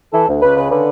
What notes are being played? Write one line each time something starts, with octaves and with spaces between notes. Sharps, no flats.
E3 A4
D2
C#2 B4
C#3 B4
D3 B4